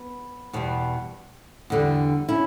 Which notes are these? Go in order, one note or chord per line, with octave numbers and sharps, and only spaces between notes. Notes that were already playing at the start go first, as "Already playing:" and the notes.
Already playing: B3
E2 B2 G3
E2 D3 G3
C#4 E4